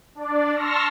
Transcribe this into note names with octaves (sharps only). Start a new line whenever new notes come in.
D4 D5
A5 C6 C#6 E6 F6 A#6